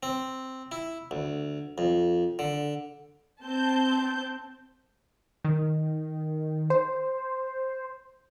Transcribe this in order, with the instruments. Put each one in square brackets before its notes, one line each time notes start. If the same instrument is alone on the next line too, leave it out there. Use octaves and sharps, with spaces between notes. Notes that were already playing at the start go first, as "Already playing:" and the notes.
[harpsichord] C4
E4
D2
F2
D3
[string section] C4 A5 G6
[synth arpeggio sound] D#3
C5